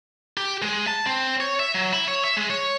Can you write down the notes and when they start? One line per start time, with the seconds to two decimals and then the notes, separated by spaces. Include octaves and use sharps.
0.37 G4
0.62 G#3
0.88 A5
1.06 C4
1.40 C#5
1.59 E5
1.74 F#3
1.93 E4
2.08 C#5
2.24 E5
2.37 G#3
2.50 C#5